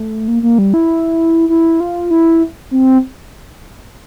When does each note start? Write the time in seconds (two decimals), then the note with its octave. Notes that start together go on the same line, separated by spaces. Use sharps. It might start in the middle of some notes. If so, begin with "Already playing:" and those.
Already playing: A3
0.28 A#3
0.43 A#3
0.58 G3
0.74 E4
1.49 E4
1.80 F4
2.11 E4
2.71 C4